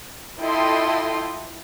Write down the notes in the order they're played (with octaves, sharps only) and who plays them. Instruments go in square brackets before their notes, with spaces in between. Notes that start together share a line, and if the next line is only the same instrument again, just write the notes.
[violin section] E4 F4 A4 D#5 G5 C6